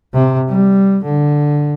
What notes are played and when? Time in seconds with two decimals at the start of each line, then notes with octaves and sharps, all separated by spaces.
0.14 C3
0.49 G3
1.04 D3